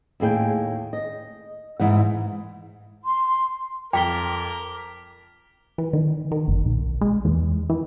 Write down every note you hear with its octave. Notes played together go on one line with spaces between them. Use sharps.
D#2 A2 G#4 G5
D#5
G#2 E3 F#5
C6
F2 A#4 G5 D6 B6 G7
E3
D#3
D#3
G1
B1
G#3
E2
E3